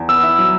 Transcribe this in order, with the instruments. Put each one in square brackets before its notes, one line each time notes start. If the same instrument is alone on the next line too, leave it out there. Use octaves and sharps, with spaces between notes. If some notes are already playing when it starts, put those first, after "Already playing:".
Already playing: [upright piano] E2
[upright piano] B3 [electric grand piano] E6
[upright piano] E4
F#3